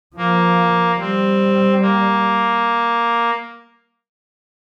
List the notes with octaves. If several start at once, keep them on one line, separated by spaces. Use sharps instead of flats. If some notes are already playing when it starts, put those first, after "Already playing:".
F3 A#3
G3 C4
A#3